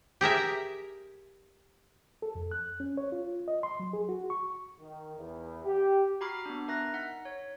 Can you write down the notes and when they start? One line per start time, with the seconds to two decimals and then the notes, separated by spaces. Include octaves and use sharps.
0.21 G4 G#4 A#4 E5
2.22 A4
2.35 F2
2.51 F#6
2.80 C#4
2.97 C#5
3.12 F4
3.48 D#5
3.63 C6
3.80 F#3
3.93 G#4
4.09 F#4
4.30 C#6
4.80 D#3
5.17 E2
5.65 G4
6.21 F#4 A#5 B5 D6 F6 C7
6.45 B3 D4
6.68 A#4 E5 A#5 F#6 A#6
6.93 D#4 F#5 B6
7.25 C#5